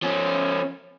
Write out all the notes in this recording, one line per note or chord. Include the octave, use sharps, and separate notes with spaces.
F3 C#4